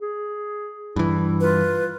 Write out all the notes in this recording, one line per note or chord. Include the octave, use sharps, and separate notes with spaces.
G#4
G2 E3 E4
F4 B4